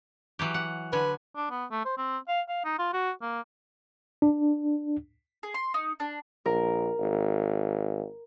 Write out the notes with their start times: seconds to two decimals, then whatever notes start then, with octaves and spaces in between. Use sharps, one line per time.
0.39 E3 F#3 G4
0.54 F#5
0.93 D3 B4 G#5
1.36 D4
1.50 B3
1.71 A3
1.85 C5
1.97 C4
2.28 F5
2.49 F5
2.65 D#4
2.79 F4
2.93 F#4
3.22 A#3
4.22 D4
5.43 G#4
5.54 C6
5.74 D#4
6.00 D4
6.46 A#1 A#4
6.98 G#1